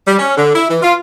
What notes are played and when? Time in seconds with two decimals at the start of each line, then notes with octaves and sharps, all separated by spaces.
0.07 G3
0.19 C#4
0.36 D3
0.55 E4
0.70 E3
0.82 F4